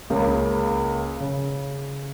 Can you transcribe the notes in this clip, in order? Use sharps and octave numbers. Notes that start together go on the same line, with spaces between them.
C#2 C#3 A#3
C#3